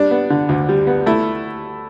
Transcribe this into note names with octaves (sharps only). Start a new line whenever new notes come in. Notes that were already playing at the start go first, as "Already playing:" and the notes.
Already playing: G3 D4
B3
D3
D2
G3
B3
A3 E4